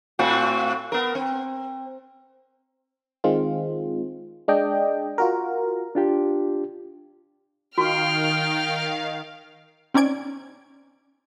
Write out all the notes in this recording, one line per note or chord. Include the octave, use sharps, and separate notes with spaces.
A2 C4 F#4
B3 A#4
C4
D#3 G#3 C4 F4
G#3 D4 D5 D#5 G5
F4 F#4 A#4
D4 F4 G4
D#3 F#4 F5 G5 C#6 F6
C4 C#4 D#4 D5 G#6 D7